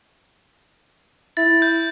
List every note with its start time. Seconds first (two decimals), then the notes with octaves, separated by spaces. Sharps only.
1.37 E4 A6
1.62 G6